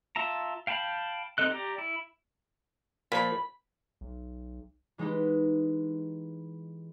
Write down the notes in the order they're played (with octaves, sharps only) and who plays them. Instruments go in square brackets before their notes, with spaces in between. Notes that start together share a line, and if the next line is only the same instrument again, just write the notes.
[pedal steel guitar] F4 E5 A5 A#5
F5 G5 A5 B5
C4 D#4 A4 D#5 F#6
G4 D5 A#5
E4
[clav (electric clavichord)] A#2 F3 [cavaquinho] B5
[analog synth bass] B1
[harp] E3 G#3 B3 D#4 G4 B4